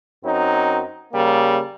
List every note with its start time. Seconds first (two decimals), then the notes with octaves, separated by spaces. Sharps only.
0.23 F#2 F#3 C4 D#4
1.13 C#3 G3 A#3